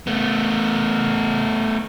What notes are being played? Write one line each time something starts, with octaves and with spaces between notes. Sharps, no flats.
A3 B3